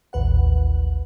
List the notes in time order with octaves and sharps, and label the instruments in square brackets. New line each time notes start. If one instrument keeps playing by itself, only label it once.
[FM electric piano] A1 D#2 B4 F#5